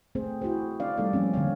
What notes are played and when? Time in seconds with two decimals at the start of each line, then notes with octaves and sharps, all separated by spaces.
0.15 A3 C4 G#4 C5
0.41 E4 F#4 G#4 C5
0.80 C4 D4 D5 F5
0.97 G3 A3 C4 D#4 A4 D5
1.13 F3 A#3 C4 C#4
1.34 D3 C4 C#5 F5